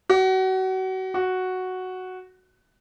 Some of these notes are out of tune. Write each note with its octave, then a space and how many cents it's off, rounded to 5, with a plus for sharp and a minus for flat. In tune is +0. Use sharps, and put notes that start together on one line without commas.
F#4 +30
F#4 +0